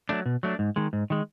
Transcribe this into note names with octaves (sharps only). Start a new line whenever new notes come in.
F#3 A3 D4
B2
F#3 A3 D4
G#2
D#3 G#3
G#2
D#3 G#3